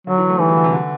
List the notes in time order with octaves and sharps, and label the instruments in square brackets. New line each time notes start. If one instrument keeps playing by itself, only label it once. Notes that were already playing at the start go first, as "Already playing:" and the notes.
[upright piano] D3 [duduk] F#3
[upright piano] E3
A3
[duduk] E3 [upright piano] G3
[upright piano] F#3
D3
C3
D3